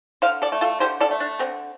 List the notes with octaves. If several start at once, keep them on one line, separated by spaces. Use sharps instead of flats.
D3 C5 F5
A4 D5
A3
F4 A4
D3 G4 C5
A4 D5
A3
D4
D3 C4